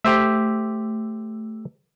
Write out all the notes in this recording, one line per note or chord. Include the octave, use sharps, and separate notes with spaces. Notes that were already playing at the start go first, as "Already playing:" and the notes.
A3 G4 C5 E5